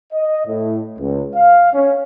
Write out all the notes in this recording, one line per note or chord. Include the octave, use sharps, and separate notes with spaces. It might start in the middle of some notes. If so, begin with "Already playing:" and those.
D#5
A2
C#2
F5
C#4